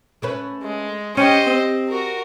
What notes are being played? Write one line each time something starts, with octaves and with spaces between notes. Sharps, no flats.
A3 C#4 B4
G#3
C#4 G4 C5 D#5
C4
F#4 A#4